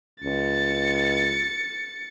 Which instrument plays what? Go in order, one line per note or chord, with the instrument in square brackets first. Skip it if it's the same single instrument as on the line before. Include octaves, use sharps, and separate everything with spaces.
[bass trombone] C#2 [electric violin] A6 C#7